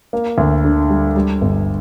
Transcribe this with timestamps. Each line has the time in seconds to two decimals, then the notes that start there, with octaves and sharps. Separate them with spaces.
0.13 A#3
0.38 D2
0.65 D3
0.89 G3
1.16 G3
1.41 G1